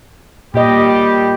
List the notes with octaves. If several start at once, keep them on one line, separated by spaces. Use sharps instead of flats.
A#2 G3 G4 D#5